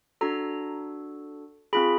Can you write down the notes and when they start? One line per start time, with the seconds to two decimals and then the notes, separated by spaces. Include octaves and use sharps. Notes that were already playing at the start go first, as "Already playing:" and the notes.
0.21 D4 F#4 A4 A#5
1.73 C4 F4 G#4 B5